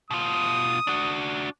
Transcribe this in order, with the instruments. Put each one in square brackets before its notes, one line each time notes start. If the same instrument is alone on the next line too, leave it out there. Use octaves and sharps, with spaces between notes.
[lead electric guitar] B2 F4 [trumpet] D#6
[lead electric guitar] D4 F#4